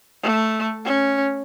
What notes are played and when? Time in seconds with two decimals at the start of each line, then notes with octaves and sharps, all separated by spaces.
0.23 A3
0.85 C#4